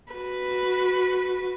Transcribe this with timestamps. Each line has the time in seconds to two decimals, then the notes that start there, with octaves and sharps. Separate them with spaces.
0.13 F#4 B4